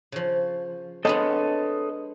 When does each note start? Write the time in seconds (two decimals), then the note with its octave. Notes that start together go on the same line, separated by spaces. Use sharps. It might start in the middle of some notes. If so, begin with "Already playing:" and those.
0.12 C#3 F3
1.05 G#3 B3 D4 A4 C#5 D#5